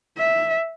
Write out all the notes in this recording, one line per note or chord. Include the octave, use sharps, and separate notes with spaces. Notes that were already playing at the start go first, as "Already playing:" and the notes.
E5